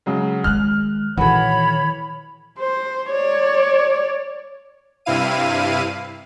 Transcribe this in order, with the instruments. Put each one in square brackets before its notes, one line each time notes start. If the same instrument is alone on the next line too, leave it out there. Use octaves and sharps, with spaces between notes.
[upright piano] C#3 F#3 G#3
[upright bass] D#3 G#3 [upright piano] F6 F#6
[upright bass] A#2 D#3 [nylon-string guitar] E3 A4 [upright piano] F#4 [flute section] C#5 B5
[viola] C5
C#5 D5
[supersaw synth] G2 C3 E4 F5 D#7